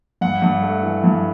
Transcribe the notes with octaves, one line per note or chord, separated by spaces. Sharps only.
G2 F#5
G2
A3
E3
G2